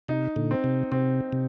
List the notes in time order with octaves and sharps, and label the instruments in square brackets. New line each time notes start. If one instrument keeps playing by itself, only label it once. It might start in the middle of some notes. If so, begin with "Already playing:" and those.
[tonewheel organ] C3 [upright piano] D#4
[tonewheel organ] A#2 D3
[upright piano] C4
[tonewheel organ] C3
[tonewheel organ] C3 [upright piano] C4
[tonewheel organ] C3